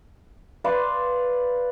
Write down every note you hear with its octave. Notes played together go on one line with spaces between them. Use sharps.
B4 D5 F5 C6